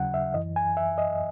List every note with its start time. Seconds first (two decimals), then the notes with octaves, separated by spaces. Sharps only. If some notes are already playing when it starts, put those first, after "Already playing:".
Already playing: D#2 C#3 F#3 F#5
0.14 E5
0.34 F#2 E3 D#5
0.56 G#5
0.77 E5
0.98 D#5